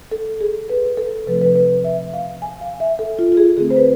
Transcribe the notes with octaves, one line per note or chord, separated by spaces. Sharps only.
A4
G#4
B4
A4
C3 F3 A3 C4 B4
B4
B4
E5
F5
G#5
F5
E5
A4
F4
F4
G#4
D3 A3 C4 G#4
C5
B4